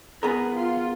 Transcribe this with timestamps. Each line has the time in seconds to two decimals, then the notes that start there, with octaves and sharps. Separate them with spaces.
0.23 B3 G#4 A#4 B4
0.55 F4